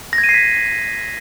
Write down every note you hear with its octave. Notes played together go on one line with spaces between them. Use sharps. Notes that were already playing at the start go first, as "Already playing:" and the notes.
A#6
G#6
D#7
C7
B6